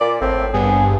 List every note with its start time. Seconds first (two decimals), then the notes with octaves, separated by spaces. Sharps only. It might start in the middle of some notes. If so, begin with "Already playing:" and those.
0.01 A#2 D5
0.21 G#1 A2 C4
0.54 G2 B3 G#4